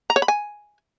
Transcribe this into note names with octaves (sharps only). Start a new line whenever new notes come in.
A#5
C#5
B5
G#5